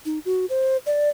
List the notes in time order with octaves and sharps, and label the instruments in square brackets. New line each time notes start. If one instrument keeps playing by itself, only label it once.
[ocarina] D#4
F#4
C5
D5